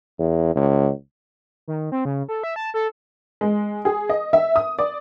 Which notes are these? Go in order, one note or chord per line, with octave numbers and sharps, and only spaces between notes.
E2
C#2
D#3
C4
C#3
A4
E5
A5
A4
G#3
G#4
D#5
E5
D#6
D5